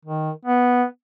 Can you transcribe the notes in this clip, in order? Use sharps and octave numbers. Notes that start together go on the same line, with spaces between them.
D#3
B3